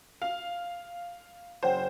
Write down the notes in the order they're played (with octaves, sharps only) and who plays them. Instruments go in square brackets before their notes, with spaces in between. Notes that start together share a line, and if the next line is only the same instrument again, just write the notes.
[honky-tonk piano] F5
[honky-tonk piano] F#1 C5 [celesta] C#5 F#5 G5